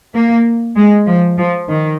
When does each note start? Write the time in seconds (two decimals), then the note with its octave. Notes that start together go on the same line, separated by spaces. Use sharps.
0.14 A#3
0.76 G#3
1.07 F3
1.38 F3
1.69 D#3